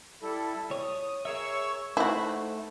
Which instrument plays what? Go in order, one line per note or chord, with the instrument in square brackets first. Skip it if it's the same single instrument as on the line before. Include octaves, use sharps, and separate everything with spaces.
[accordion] G3 E4 A4
[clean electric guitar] C#5 [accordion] D#6
[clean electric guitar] G#4 A#4 E5 [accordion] C#5 C#6 E6
[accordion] A3 [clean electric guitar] D#4 C5 [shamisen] E4 F#4